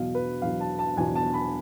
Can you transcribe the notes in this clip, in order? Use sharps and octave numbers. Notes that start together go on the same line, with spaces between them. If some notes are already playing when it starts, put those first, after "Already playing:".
Already playing: E2 B2 F#3 F5
B4
E2 B2 F#3 F5
A5
A5
E2 B2 F#3 G#5
A5
B5